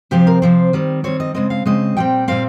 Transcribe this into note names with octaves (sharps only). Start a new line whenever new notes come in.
C3 F3 C4 G4
A#4
C3 F3 C4 C5
D#3 G3 C4
D#3 G3 C4 C#5
D#5
C#3 G#3 C4 D#5
F5
C#3 G#3 C4 D#5
A#2 G3 C4 G5
A#2 G3 C4 F5